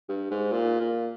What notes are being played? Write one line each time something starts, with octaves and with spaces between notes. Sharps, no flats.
G2
G#2
A#2
A#2